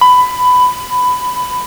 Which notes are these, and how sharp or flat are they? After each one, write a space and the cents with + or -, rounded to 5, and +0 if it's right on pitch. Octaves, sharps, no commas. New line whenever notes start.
B5 +15